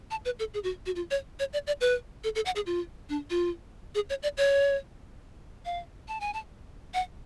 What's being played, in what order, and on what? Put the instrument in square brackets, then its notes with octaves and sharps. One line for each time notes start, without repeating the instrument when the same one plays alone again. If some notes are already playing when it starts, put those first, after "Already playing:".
[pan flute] A5
B4
A4
G#4
F#4
F#4
F4
C#5
C#5
D5
D5
B4
A4
A4
F#5
G#4
F4
D4
F4
G#4
C#5
D5
C#5
F5
A5
G#5
A5
F#5